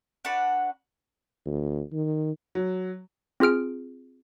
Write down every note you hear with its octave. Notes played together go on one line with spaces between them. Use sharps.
D4 F#4 B4 F#5
D2
D#3
F#3
C4 F4 G#4 F6 D7